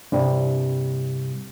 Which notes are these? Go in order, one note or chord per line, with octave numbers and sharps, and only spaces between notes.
G2 C3 G3